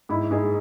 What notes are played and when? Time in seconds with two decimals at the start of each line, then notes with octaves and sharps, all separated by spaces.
0.09 G#2 E4
0.31 G#2 G#4